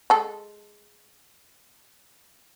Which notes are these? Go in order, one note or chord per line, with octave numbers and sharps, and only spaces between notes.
G#3 A4